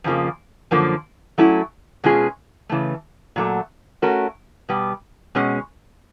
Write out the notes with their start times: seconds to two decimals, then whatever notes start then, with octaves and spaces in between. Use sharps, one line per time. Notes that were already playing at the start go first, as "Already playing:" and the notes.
0.04 F2 C#3 F3 A#3
0.71 F#2 D3 F3 A#3
1.38 F#3 A3 C#4 E4
2.04 B2 G#3 C#4 F4 G#4
2.69 C#3 E3 A3
3.36 A#2 F#3 A3
4.02 A3 C#4 F#4 A#4
4.69 B2 G3 B3
5.35 B2 G#3 C#4